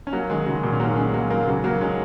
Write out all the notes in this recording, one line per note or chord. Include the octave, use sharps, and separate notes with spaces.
C#4
F#3 A#3
D#3 G#3
C#3 F#3
A#2 D#3
C#4
F#3 A#3
G#3 C#4
F#3 A#3
F#3 A#3
C#3 F#3
F#3 A#3
G#3 C#4